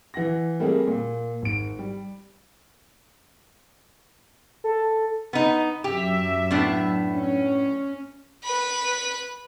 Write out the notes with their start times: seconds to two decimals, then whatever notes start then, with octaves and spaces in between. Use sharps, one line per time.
0.14 E3 F#5 A#6
0.60 G3 A3 A#3 C4 G#4
0.87 A#2
1.42 G#1 D7
1.79 G3
4.64 A4
5.33 B3 D#4
5.84 F#2 G4 E5
6.51 A2 B3 D4
7.13 C#4
8.44 B4 B5